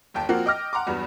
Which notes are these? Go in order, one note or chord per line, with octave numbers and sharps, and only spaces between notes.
G1 D#2 G5 A5
F3 A#3 C4 F4 F#4 A#4
D#5 G5 D6 F6 A#6
F#5 A#5 C6 D6
E2 G2 F#3 B3